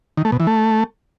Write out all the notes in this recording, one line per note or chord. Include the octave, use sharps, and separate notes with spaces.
D#3
A3
B2
E3
A3